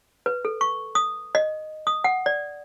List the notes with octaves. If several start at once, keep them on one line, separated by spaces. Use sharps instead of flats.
B4
A4
C#6
D#6
D#5
D#6
F#5
D5